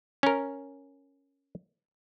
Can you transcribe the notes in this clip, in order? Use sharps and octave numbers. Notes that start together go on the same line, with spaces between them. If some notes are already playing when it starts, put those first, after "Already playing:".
C#4 A#4